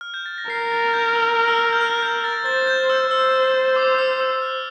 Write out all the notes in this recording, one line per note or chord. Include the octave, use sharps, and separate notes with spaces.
F6
G6
A6
A#6
A#4 C7
A6
F6
G6
E6
F6
E6
G6
F6
G6
A6
C5 A6
G6
E6
C5 E6
D6
E6
E6
F6